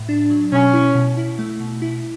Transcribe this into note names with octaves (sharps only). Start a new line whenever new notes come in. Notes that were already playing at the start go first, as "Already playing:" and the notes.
Already playing: A2
D4
F#3
B2 C#4
E4
B2
E4
A3
B2
E4